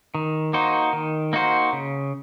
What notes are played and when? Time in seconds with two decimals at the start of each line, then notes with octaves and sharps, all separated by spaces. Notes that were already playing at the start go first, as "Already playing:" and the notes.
0.15 D#3
0.53 A#3 D#4 F#4 C5
0.93 D#3
1.33 A#3 D#4 F#4 C5
1.73 C#3